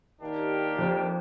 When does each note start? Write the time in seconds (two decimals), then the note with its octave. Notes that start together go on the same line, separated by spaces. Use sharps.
0.21 D#2 D#3 A#3 D4 G4
0.78 F2